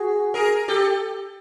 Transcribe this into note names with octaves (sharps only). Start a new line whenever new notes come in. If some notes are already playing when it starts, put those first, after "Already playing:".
Already playing: F#4 G#4
G#4 A#4
G4 A4